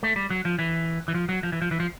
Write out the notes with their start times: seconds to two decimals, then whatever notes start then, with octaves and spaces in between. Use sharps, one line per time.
0.03 A3
0.16 G3
0.30 F#3
0.45 F3
0.59 E3
1.08 E3
1.14 F3
1.29 F#3
1.43 F3
1.52 E3
1.62 F3
1.71 E3
1.80 F3